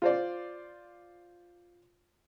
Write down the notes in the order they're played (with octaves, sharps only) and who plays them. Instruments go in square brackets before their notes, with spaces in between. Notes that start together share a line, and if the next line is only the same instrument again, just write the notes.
[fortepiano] F4 C5 D5